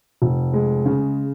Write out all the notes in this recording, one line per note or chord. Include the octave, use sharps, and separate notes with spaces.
F1
G#3
C#3